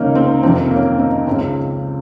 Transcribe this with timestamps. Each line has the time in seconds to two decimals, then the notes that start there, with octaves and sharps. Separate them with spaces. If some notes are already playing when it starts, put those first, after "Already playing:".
Already playing: C#2 C3 D#3 A#3 C#4 D#4
0.15 C4
0.43 F2 C3 D#3 C4
0.71 A#3 C#4
0.99 C4 D#4
1.27 C#2 C#3 C4